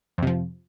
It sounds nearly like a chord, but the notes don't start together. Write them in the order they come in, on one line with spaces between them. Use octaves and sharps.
F2 C3 F3